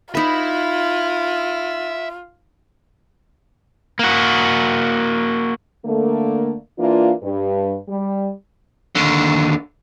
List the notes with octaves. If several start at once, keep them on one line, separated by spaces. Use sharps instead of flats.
D#4 F4 B4 E5 B5
A#3 F#4
D3 A3 A#3
E3 A#3 D4 F4
G2
G3
D#2 D3